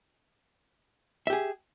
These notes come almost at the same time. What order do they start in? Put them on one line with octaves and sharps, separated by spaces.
E5 G4 G#4